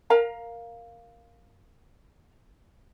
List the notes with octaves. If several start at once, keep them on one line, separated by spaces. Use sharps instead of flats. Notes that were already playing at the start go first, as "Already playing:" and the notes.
A#4 F5 A#5